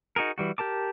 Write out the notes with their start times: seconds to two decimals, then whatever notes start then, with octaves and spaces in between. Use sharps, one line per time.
0.16 D#4 F#4 G#4 A#4
0.38 E3 G3 F#4
0.58 G4 A#4 A5 D6